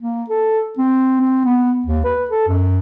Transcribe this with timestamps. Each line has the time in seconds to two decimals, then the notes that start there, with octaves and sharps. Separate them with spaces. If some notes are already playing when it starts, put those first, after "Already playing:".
0.01 A#3
0.29 A4
0.78 C4
1.21 C4
1.45 B3
1.86 D#2
2.04 B4
2.30 A4
2.48 F#2